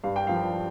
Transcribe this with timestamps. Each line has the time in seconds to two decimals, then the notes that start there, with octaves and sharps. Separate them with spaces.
0.04 G2 F5
0.16 G5
0.27 F3 F5